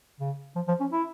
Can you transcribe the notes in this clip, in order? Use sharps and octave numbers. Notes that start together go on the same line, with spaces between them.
C#3
F3
F3
C#4
E4